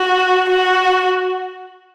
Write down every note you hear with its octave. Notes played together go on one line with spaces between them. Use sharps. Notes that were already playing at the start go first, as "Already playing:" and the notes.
Already playing: F#4
F#4